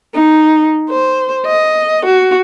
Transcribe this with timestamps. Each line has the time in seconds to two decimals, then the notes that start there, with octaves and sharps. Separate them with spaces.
0.15 D#4
0.90 C5
1.46 D#5
2.06 F#4